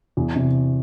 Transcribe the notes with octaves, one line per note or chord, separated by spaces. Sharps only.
E2
C3